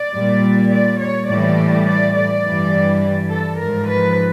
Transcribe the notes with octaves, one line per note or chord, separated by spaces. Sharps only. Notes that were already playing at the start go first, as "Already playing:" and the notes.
Already playing: D5
A#2 G3
D5
C#5
A2 E3 G3 D5
D5
D5
G2 E3 G3
A4
G#2 F3 A#4
B4